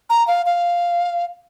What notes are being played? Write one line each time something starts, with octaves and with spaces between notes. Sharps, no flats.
A#5
F5
F5